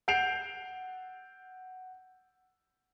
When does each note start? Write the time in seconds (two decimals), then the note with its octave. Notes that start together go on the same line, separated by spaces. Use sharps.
0.08 F#5 G6 C7 D7 F7